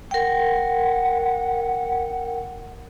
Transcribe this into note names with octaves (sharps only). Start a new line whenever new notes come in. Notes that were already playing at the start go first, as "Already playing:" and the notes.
A#4 F#5 G5